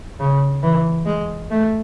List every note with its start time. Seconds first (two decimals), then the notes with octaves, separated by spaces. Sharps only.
0.19 C#3
0.63 E3
1.06 G#3
1.51 A3